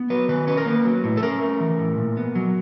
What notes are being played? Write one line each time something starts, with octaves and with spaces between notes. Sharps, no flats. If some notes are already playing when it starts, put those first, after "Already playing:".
Already playing: B3
F#3 B4
D#3 B4
C#4 B4
A#4
A#3 B4
F#3
A2
A4
C#4 A#4
A3
E3
A2
A#2
B3
F#3